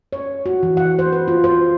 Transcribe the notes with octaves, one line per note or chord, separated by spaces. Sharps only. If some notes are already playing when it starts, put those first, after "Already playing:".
C#5
F#4
E3
F#5
C5
B4
F4
C5